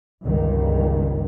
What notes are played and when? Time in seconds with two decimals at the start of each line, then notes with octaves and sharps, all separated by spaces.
0.24 G1 C#2 G2 D#3